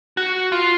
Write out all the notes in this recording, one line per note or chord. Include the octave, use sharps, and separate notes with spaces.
F#4
F4